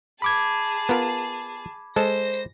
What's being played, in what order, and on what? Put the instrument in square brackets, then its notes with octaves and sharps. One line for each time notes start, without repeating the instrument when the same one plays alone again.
[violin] G#4 A5 [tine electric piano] B5 D6 G#6
[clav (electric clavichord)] B3 F4 A#4
[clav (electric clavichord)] G#3 A4 A5 [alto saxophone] C5 [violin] A#6